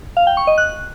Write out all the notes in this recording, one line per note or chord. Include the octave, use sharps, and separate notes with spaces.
F5
G5
C#6
D#5
F#6